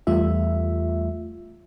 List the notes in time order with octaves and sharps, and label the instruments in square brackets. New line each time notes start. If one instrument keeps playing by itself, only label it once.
[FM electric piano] E2 G3 A3 F4 E5